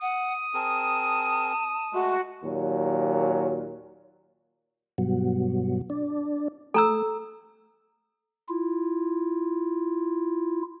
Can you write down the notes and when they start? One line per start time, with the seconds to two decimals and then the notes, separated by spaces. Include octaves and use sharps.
0.01 F#5 D#6
0.54 C4 G#4 A#4 A5
1.93 G#3 A3 F#4
2.44 D#2 A#2 F#3
4.98 G2 B2 F#3
5.90 D4
6.74 A3 A4 A#5 E6
8.49 E4 F4